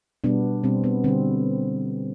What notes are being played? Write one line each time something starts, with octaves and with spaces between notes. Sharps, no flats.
B2 G3 B3 D4
B2 G3 C4
B3
D3 G3 C4